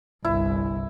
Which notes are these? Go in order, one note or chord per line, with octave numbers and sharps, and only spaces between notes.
G1 C2 E4